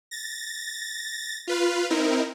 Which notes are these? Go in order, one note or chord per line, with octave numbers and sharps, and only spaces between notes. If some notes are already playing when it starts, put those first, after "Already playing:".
A6 A#6
F4 B4 F5
C4 D#4 E4 A#4